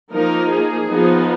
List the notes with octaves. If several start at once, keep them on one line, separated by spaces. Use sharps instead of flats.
F3 A#3 D#4 A#4
G#4
F3 B3 D#4